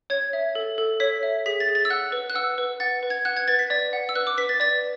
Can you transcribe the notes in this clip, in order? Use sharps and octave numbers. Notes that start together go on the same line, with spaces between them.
C#5 G#6
E5
A4
A4
C#5 B6
E5
G#4 B6
A6
G#4
A6
E6
F#5 F#6
B4
F#6
F#5 E6
B4
F#5 A6
B4
G#6
F#5 F#6
G#6
B4 A6
B6
D5 A6
F#5
E6
B4 F#6
D6
B4 B6
A6
D5 A6